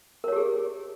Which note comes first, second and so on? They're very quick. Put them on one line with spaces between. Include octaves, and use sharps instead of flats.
A#4 C#5 G4 G#4